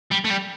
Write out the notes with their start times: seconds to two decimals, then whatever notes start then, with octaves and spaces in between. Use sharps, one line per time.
0.11 G3
0.25 A3
0.30 G3